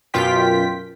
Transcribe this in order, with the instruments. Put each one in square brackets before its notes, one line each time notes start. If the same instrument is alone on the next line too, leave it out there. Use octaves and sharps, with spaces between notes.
[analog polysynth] F#2 B2 F4 G5 B6